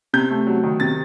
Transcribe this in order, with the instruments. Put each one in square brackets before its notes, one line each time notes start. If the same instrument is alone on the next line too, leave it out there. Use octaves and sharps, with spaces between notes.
[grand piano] C3 G6
A3
F#3
D#3
C3 A6